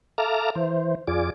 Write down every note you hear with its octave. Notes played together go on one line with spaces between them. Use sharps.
A4 E5 F5 A#5 D6 F6
E3 C5
F2 F4 G#4 D5 D6